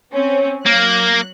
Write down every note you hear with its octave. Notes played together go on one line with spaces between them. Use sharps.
C4 C#4
F#3 A#3 F#6